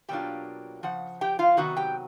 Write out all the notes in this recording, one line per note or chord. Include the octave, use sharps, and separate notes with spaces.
B2 F#3 A#3 D4 F4 G4 G5
C#3 F3 F#5
G4 G5
F4 F5
C3 D#3 F#3 B3 F#4 F#5
G4 G5